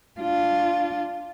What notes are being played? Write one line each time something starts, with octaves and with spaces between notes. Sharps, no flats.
D4 F4